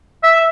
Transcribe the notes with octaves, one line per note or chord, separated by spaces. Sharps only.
E5